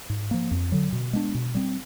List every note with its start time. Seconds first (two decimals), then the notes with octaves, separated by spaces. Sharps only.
0.10 G#2
0.31 F3 A#3
0.51 F2
0.72 D3 F#3
0.93 B2
1.13 G#3 B3 D4
1.35 B2
1.55 G3 C4